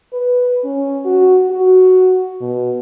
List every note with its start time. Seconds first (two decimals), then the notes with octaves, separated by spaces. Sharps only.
0.13 B4
0.64 C#4
1.05 F#4
1.51 F#4
2.41 B2